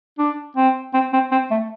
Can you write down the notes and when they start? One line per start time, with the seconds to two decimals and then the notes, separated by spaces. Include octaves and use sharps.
0.18 D4
0.57 C4
0.94 C4
1.13 C4
1.31 C4
1.51 A3